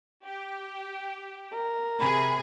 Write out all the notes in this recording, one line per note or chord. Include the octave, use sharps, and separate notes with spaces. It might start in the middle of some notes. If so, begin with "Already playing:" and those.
G4
A#4
C3 G#4 B5